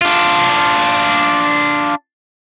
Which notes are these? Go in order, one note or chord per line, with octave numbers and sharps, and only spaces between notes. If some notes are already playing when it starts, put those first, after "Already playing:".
D4 F4